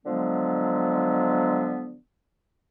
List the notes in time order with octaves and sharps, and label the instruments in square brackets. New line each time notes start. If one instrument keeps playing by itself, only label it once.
[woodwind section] D3 F3 F#3 G#3 B3